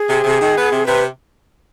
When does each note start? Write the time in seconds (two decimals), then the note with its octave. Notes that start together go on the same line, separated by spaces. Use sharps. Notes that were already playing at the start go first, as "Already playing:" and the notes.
Already playing: G#4
0.08 C3
0.24 C3
0.40 D#3
0.56 B3
0.71 C3
0.86 C3 B4